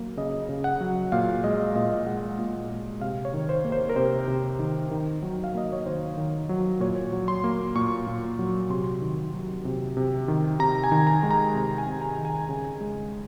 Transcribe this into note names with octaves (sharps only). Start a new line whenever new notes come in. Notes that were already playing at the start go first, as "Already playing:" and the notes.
Already playing: F#3 A#3
C#3 D#5
C#3
F#5
F#3
A#2 F5
G#3 D#5
A#2 D#5
G#3 F#5
A#2
G#3
C3 F5
C#5
D#3
C5
A#3
C5
A#4
C3 C5
C3
D#3
D#3
F#3
F5
A#3 D#5
C#5
D#3 C5
D#3
F#3
A#2 C#5
F#3
C6
A#3
A#2 C#6
A#2
F#3
C3 C6
D#3
F#3
C3
C3
D#3
C3 A#5
G#5
D#3
A#5
G#3
A#5
C3 A#5
G#5
C3
A#5
D#3
G#5
C#3
G#3